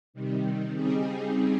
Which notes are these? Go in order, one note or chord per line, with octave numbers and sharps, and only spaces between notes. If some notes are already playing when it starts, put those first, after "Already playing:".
C3 D#3 G3
C#3 G3 C4 D#4 G#4